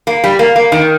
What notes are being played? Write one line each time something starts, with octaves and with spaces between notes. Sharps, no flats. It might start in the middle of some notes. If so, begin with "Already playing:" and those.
A#3
G3
A#3
A#3
D#3